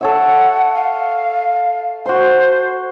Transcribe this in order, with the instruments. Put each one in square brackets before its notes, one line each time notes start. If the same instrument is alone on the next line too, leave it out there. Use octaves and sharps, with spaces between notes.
[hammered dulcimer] A4 C#5 E5 [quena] F#5
[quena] F5
[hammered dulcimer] F#4 C6 [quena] C5